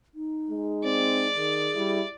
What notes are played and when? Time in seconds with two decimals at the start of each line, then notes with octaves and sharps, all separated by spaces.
0.15 D#4
0.50 G#3
0.84 C4 D5
1.35 D#3 G#4
1.75 G3 E4